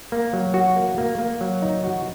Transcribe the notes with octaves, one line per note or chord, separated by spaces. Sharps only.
A#3
F#3
F#4
A#3
A#3
A#3
F#3
D#4
F#4